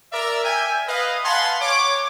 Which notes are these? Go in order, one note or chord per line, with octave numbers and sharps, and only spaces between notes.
A#4 D5 E5
E5 G5 G#5
B4 D#5 F5
F5 F#5 G#5 A5 B5 C6
C#5 D6